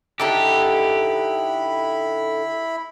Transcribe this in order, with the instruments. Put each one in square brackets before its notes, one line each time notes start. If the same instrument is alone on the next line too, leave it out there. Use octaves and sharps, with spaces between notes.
[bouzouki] D3 D#4 A4 [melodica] E4 B5 [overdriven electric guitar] G4